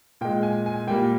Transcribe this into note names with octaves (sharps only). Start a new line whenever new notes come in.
A#2 G#3 G5
G#5
G#5
A#2 G3 A#3 G5